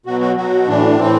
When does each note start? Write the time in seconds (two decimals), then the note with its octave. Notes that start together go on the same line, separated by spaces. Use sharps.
0.06 B2 F#3 F#4
0.21 F#4
0.36 B2 F#3 F#4
0.68 A2 E3 D4
0.98 A2 E3 C4